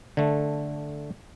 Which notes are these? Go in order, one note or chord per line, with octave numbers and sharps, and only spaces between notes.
D3 A3